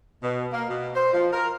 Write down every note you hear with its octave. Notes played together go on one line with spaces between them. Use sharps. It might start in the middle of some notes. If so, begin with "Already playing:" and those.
B2
A#3
B2
C5
F3
A#4